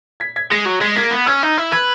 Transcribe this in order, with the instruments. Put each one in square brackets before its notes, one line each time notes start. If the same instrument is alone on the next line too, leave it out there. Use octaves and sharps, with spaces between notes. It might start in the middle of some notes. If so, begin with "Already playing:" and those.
[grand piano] G#6 B6
G#6 B6
[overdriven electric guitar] G#3 [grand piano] A#6 C#7
[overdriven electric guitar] F#3
[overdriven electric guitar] G#3 [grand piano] G#6 B6
[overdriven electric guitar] A#3 [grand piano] G#6 B6
[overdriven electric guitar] B3
[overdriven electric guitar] C#4 [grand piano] E6 G#6
[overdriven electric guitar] D#4
E4
[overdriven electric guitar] B4 [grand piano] E6 G#6